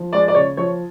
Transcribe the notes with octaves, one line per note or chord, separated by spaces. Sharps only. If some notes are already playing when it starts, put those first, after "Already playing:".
Already playing: F3
G#3 D5
D5
C#3 C#5
F3 C#5